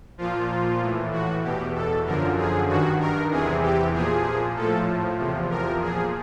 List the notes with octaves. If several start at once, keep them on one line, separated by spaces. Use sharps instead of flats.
A#2 F3 F4
A2 E3
F#4
E2 B2 G4
A4
F#2 D3 F3 A#4
G#4
G2 D#3 F#4
A#4
E2 C3 E3 G#4
G4
A#2 F3 G#4
A2 F3 A4
E2 C3 F3
A#4
A#2 F3 G#4